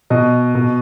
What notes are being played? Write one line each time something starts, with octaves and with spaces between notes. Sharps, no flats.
B2 D#5
B2